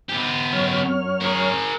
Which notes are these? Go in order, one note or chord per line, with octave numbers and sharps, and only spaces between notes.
B3 G4
F#2 C#5 F6
G#4 A#4